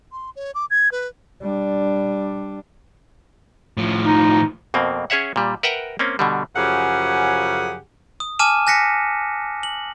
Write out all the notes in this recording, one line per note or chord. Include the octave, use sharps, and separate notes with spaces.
C6
C#5
D6
G#6
B4
G3 D4
A2 F3
D#4
F2 B2 A#3 C4
C#4 G#4 C#5 E5 F#5
A#2 G3
A#4 B4 E5 F#5 G5 A#5
A#3 C4 C#4
B2 D3 G3
F#2 C#3 F3 G4 G#4 F#5
D#6
G#5 A5 D6 F6 D#7 E7
G#5 F#6 A#6 B6 C#7
F#7